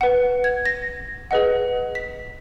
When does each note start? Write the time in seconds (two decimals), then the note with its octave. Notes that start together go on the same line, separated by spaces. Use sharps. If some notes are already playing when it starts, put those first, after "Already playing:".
0.01 B4 F#5
0.44 G#6
0.66 A#6
1.31 G#4 B4 D#5 F#5
1.95 B6